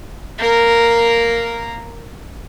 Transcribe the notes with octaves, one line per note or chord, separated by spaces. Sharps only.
A#3 A#4